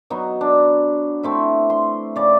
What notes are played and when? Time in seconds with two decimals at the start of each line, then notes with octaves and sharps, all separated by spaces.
0.10 F#3 B3 D#4
0.41 D4
1.23 A3 C4 E4
1.70 C6
2.16 C#3 D5